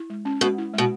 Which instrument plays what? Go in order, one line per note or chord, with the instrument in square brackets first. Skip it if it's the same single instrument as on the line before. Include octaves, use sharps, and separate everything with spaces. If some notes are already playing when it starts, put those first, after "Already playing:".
Already playing: [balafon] E4
G#3
C#4
[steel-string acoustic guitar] B2 [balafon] G#3
[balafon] E4
[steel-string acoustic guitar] B2 [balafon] G#3